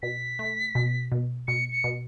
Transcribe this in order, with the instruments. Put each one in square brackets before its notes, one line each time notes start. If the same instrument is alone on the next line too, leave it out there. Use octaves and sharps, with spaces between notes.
[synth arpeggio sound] B2 [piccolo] B6
[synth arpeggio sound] A3
B2
B2
[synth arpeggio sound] B2 [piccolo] C#7
[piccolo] C#7
[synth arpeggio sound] B2